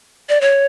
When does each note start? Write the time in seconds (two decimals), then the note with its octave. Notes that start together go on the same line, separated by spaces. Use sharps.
0.29 D5
0.41 C#5